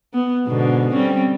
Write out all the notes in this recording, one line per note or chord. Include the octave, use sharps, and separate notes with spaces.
B3
G#2 B2 D3
G3 C4 C#4